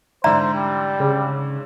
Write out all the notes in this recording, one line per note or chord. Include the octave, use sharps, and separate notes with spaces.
G#2 D3 E3 C5 D5 E5 A#5
G3
C#3